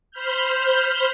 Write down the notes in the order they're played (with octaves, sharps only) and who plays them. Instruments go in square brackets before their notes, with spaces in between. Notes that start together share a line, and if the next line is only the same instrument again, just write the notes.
[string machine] C5 B5 F6 G6